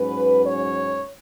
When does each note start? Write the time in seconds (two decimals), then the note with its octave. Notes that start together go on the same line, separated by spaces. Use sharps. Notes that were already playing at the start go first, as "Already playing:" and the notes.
Already playing: G#2 F#3 C#4 B4
0.45 C#5